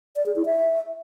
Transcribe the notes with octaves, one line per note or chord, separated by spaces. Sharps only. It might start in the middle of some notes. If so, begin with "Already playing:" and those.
D5
G#4
E4
E5